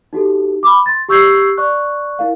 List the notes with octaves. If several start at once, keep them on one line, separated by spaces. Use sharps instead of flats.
D#4 F#4 G4 A4
B5 D6
C6 A6
G4 C#6 E6 G6 G#6 C7
D5 C#6 F#6
E4 A#4 F5